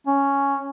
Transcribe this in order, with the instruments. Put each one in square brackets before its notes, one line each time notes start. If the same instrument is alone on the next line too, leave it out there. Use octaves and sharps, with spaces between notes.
[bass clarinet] C#4